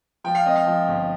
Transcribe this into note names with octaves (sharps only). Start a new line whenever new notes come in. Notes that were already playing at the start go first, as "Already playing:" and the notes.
F3 G5
F5
C4 D#5
F5
F3
G1